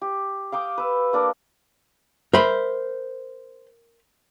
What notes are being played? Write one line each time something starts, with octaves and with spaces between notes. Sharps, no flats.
G4
F5 G5 D6 D#6
B4 E6
A#3 D4 A#4
A#4 C5 E5 B5